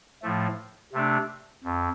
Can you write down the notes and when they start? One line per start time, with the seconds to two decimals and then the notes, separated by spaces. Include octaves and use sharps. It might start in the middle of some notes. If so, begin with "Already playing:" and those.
0.23 A2 F3 A3
0.93 C3 A3 D4
1.64 F2